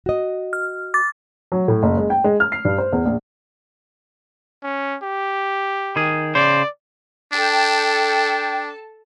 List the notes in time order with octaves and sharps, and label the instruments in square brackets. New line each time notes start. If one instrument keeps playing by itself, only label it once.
[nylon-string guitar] F#4 D#5
[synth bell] F6
D6 A6
[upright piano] F#3
A2
F#1
G#3
G5
G#3
F6
C7
G2
C5
E2
A#1
[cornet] C#4
G4
[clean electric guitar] D#3 G#4
[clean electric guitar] C#3 C5 [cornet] D5
[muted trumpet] D4 [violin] A4 A5 [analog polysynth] G5